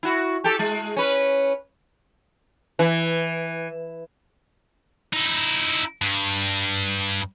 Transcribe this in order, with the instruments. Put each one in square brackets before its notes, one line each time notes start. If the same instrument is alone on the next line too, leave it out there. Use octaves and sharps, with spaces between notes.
[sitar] E4 F#4
G4 A4
G#3
C#4 B4
E3
[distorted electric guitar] D#4 E4
G2